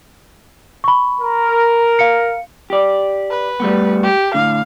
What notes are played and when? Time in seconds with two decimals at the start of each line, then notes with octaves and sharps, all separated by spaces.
0.84 B5 C#6
1.21 A#4
1.99 F5 C#7
2.70 G4 D5
3.31 B4
3.60 G3 A3 B3
4.03 G4
4.34 A2 D3 F5